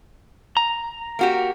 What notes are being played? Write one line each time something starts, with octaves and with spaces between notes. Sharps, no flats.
A#5
A#3 F#4 G4